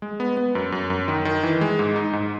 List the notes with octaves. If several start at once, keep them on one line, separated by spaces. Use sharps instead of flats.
G#3
B3
B3
F#2
F#2
F#2
D#3
D#3
E3
G#3
G#2
D#4
G#2